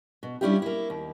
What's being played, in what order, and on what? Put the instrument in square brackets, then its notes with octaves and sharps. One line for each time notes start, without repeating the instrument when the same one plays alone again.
[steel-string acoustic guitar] B2
G3 C#4 D4 E4 F4 G4
A#3 E4
D#2